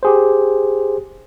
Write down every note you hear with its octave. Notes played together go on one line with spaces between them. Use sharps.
G4 G#4 C5